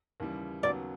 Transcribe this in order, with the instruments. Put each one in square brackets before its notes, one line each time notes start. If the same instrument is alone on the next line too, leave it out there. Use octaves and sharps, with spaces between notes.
[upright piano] D#2 C#3 E3 G3
[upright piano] D#2 C#3 F#3 B3 [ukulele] D5